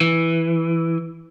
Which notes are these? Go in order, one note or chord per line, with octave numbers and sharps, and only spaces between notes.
E3